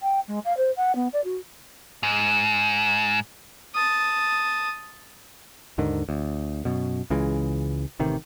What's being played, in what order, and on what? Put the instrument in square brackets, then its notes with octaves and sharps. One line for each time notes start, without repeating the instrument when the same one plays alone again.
[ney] G5
G#3
F5
C5
F#5
B3
D5
F#4
[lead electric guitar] G#2
[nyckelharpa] A5 D#6
[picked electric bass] D#2 G#2 D3 D#3
D2
F#2 B2
C#2 C#3 E3 G#3
A1 C3 D#3